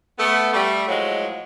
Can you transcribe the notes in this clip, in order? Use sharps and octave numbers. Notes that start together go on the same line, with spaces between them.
A3 B3
G3 A3
A2 F3 F#3 G#3